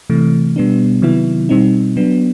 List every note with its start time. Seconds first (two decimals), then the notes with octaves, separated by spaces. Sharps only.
0.10 C3 E3 A3
0.56 B2 G3 B3 D4
1.02 C3 D#3 F#3 B3 E4
1.49 B2 G3 C4 D#4
1.97 F#3 B3 D4